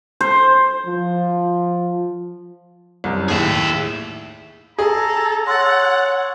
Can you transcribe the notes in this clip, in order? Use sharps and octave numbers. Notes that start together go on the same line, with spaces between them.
C5
F3
C2 F#2
D#2 A2 G#4 E5
G#4 A4 A#5
C#5 F#5 C6 E6 A6